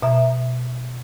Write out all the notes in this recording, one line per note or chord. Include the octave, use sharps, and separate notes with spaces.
B2 E5 A#5